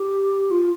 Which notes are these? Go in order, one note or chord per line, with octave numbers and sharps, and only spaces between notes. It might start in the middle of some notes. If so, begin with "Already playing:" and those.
Already playing: G4
F4